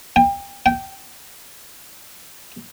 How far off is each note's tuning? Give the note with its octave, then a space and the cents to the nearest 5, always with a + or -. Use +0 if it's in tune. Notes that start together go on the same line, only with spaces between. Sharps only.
G5 +30
G5 -15